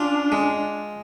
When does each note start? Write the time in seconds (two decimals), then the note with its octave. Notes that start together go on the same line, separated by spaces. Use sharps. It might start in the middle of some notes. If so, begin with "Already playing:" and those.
Already playing: C#4 D4 F4
0.32 G#3